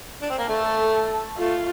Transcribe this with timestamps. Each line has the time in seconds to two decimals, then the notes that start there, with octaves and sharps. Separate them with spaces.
0.22 D4
0.30 C4
0.38 A#3
0.48 A3 A4
1.38 A3 F4